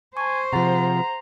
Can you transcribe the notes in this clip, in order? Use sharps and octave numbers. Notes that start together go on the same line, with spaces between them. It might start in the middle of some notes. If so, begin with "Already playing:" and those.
C5 G#5 A5 C#6
C3 F3 G#4 F#5 A#5 A6